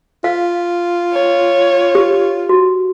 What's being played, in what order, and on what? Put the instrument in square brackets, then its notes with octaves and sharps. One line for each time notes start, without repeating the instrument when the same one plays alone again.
[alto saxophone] F4 [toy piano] F5
[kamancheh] C#5
[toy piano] G4
F#4